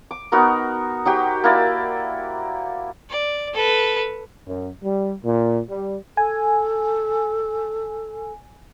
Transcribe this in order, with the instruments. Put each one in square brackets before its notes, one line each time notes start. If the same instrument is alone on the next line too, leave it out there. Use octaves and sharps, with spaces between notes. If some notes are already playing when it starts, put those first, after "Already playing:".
[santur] D6
B3 D#4 F#4 A#4
D#4 F#4 G4 C5
A#3 E4 D5 E5
[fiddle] D5
A4 B4
[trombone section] F#2
G3
A#2
G3
[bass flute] A4 [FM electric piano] G#5